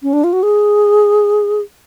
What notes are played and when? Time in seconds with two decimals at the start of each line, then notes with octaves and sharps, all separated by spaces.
0.03 C#4
0.13 D4
0.24 F4
0.33 F#4
0.43 G#4